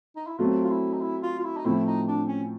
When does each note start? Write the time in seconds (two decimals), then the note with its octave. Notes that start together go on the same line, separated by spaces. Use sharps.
0.16 D#4
0.27 E4
0.38 F#3 A3 C4 F4
0.64 F4
0.70 E4
0.93 D#4
1.01 E4
1.22 F4
1.39 F4
1.44 E4
1.57 D#4
1.65 A2 F3 A3 C4 E4
1.87 D#4
2.08 D4
2.28 C#4